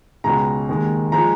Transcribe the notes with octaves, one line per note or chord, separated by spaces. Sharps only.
C#2 B2 G#3 A#5
D#2 D#3 G#3
F3 G#3 A#5